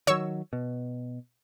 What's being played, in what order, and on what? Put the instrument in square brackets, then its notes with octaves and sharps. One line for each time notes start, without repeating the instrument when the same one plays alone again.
[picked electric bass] D#3 F#3 [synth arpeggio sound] C#5 C#6 E6
[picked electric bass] B2